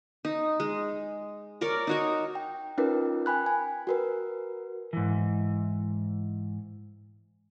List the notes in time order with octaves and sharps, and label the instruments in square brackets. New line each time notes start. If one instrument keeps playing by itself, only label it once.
[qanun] D#4
G#3
A#4 C#5 D5 A#5
D#4 F#4 C#5
[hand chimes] G5
C#4 D#4 F4 A#4 B4
G5 G#5 B5 F#6
G#5
F#4 A#4 B4
[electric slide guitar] G#2 E3